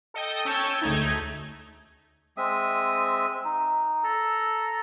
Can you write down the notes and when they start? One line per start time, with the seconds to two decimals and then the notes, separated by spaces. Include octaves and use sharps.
0.14 A4 D#5 G5
0.45 C#4 C#5 G5 A5 E6 G6
0.82 D2 G#3 A3 D#4 G#6
2.37 G#3 C4 E5 D#6
3.45 D#4
4.04 A4 A5 A#5